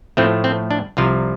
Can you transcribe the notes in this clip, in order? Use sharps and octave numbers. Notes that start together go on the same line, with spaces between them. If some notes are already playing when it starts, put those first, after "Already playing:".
A2 F3 A3 C4
C4
D4
C2 C3 F3 F4